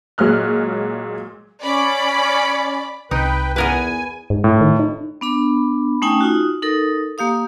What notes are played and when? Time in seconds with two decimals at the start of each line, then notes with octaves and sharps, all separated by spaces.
0.18 A#2 F#3 G#3 F6 F#6
1.63 C#4 D5 B5
3.11 C2 D#4 B4 G5
3.56 E2 B3 A#4 B4 G#5
4.30 G#2
4.44 A2
4.61 D#3
4.79 D#4
5.21 B3 D4 B5
6.02 A3 C#4 D#4 G5 G#5
6.21 D#4 F4 F#4
6.62 D#4 A4 A#4
7.18 A#3 G4 F5 D#6